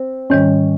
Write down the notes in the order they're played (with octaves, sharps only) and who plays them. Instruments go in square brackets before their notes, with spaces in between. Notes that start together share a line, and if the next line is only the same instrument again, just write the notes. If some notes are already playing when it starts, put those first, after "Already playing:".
Already playing: [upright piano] C4
[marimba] G#2 D#3 G3 [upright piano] C#4